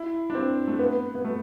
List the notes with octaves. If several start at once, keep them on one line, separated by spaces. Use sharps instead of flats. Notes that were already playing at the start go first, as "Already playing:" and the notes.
Already playing: E4
D4
C4
A3
B3
B3
A3